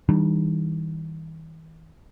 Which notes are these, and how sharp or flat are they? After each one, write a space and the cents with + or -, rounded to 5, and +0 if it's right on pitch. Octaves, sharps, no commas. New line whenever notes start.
E3 -45 G3 +0 D4 +45